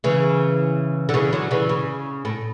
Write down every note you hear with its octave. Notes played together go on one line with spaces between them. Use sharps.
C#3 E3
D3
C#3 E3
D3 F#3
C#3 E3
C#3
A2